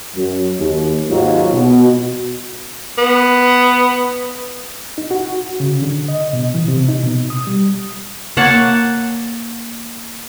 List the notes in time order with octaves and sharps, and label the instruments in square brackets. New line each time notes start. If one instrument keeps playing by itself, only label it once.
[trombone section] F#2
D#2
D#2 G#2 F#3 D#4 F4
B2
[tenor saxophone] B3
[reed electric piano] D#4
F#4
C#3
D3
D#5
B2
E3
C3
D#4
B2
D#6
G3
[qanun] A#3 C#5 F#5 A5